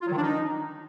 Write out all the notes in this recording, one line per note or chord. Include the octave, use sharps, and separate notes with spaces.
F4
F#3
D#3
D4
D#4